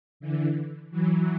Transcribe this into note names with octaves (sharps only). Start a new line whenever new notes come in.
D3 E3
E3 F#3